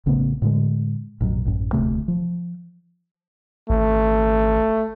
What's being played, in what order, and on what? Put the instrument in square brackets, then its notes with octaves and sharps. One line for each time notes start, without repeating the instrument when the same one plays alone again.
[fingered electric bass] A1 C#3 A3 B3
A2 D3 G#3
A1 F2 B2 F#3
A1 F#2
E1 D2 C3 A3
F3
[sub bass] G#1 [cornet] A3